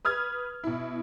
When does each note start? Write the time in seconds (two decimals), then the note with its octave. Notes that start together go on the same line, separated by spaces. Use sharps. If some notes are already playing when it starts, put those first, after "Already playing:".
0.05 B4 D#6 F6 G#6
0.64 B2 E4